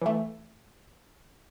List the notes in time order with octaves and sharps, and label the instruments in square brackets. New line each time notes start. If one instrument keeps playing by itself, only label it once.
[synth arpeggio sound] E3 A3